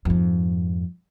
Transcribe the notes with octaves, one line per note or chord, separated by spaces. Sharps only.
F2 G#2